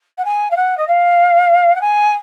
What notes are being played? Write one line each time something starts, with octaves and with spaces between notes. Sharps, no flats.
F#5
G#5
F5
F#5
D#5
F5
F#5
G#5